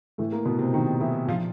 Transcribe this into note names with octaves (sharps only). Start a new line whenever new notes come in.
A2 E3 A3
A#3
B2 B3
C3 C4
D#3 D#4
E3 E4
A#2 F3 F4